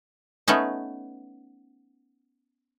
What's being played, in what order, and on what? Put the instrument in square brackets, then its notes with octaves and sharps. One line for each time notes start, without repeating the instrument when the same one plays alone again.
[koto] A3 B3 C#4 D#4